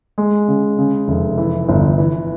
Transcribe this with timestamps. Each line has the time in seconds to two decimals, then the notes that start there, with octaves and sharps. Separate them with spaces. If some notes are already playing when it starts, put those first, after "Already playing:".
0.18 G#3
0.48 C#3
0.78 C#3
1.08 F1
1.38 E3
1.69 G1
1.98 E3